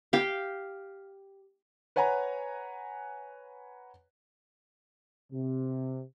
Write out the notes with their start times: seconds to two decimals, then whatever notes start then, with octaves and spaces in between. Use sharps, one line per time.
0.13 G4 F5
1.96 B4 C#5 F#5 G#5 A#5
5.31 C3